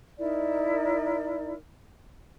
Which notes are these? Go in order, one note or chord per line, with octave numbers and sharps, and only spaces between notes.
D#4 E4 A#4 D5